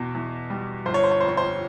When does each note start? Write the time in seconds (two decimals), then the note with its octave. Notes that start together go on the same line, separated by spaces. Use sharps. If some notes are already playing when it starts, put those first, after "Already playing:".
Already playing: E2 B2
0.15 E2
0.50 G3
0.86 G1 C5
0.94 C#5
1.04 C5
1.11 C#5
1.21 F2 C5
1.29 C#5
1.37 C5